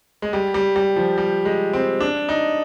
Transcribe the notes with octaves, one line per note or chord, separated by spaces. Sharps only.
G#3
G3
G3
G3
F3
G3
G#3
C4
D4
D#4